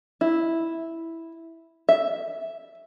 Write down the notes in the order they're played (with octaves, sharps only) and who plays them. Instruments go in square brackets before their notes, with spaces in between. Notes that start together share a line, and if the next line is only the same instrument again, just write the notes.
[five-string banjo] E4
E5